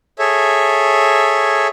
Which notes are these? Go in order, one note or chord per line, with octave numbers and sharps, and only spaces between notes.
G#4 A4 C#5 E5